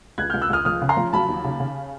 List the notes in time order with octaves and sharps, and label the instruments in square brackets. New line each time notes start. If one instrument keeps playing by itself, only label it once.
[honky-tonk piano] C#2 [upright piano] F#6 G#6
[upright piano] F6 G6
[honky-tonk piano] C#2
[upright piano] E6 F#6
[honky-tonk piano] C#2 [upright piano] D#6 F6
[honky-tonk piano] F3 [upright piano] D#6 F6
[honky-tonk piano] C#3
[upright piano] A#5 C6
[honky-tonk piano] F3
[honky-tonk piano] F#3 [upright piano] A5 B5
[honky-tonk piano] D#2
C#3
C#3